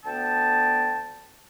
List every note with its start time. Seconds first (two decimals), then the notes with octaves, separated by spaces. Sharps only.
0.05 D2 B3 G5 A5